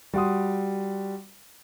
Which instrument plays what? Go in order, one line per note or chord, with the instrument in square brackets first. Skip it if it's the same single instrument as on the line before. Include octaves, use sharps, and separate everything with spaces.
[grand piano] G3 F#4 F#5 C6 D#6